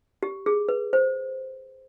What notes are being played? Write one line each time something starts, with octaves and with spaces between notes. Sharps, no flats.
G4
G#4
B4
C5